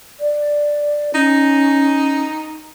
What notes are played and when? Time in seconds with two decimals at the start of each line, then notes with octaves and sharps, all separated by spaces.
0.20 D5
1.15 C#4 D#4